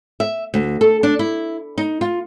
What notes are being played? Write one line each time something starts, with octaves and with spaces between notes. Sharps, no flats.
E5
D2
A4
D4
E4
D#4
F4